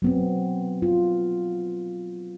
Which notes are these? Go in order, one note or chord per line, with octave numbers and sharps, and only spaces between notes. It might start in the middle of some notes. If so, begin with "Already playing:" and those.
F#3 B3 C4
F4